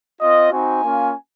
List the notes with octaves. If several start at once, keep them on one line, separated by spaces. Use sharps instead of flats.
C4 F4 D#5
C4 D#4 F#4 G#5
A#3 C#4 F4